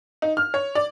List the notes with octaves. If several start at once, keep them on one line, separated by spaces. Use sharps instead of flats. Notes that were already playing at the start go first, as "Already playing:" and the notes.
D#4
F6
C#5
D5